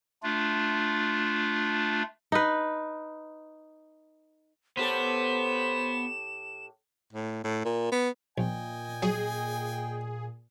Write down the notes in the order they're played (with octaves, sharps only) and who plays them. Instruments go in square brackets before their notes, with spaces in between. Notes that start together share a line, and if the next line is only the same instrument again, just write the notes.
[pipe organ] A3 D4 F4
[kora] D#4 B4
[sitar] A2 G4 A4 [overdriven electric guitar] B3 [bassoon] C5 [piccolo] E7
[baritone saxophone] A2
A2
A#2
B3
[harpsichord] A#1 [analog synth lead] A#2 [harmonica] D#5 G5 G#5
[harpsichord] F#3 [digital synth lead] G#4